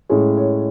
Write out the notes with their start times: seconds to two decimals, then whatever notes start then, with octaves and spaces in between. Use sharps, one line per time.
0.09 A2 G#3 C#4 C#5
0.37 C#5